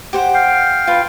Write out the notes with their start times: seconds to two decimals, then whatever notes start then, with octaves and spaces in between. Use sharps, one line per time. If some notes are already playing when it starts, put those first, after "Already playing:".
0.13 G4 C5 F#5
0.34 F5 G5
0.87 F4 B4